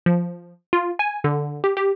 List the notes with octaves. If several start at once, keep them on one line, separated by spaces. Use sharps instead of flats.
F3
F4
G#5
D3
G4
G4